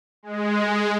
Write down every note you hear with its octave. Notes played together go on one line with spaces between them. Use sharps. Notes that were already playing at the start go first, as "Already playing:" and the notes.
G#3